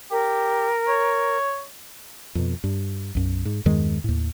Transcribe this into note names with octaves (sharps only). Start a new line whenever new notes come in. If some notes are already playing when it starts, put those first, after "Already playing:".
G4 A#4
C#5
F2 B2
G2
B1 F#2
G#2
E2 G2 D#3 G#3
D#2 A2